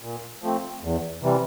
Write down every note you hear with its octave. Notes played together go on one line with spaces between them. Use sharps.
A#2
F3 A3 C4
E2
C3 E3 G3